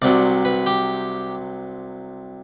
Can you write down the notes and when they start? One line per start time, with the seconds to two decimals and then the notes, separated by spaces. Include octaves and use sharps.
0.02 C2 C3 F#3 D5
0.45 B4
0.66 G4